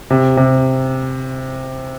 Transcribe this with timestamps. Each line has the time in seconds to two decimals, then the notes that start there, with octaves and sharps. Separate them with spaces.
0.10 C3
0.37 C3